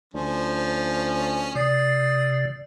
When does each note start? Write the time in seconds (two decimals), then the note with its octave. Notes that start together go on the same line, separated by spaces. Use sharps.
0.14 D2 F3 C#4
1.55 C3 D5 D#6